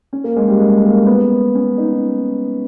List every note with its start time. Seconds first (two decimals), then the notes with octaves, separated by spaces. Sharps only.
0.13 C#4
0.24 A#3
0.36 G#3
0.48 G3
0.59 G#3
0.83 A#3
1.07 B3
1.55 C#4
1.78 D#4